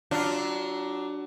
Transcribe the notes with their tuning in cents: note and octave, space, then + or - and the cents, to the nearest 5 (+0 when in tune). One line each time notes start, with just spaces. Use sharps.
F#3 +25 D4 +0 F4 +0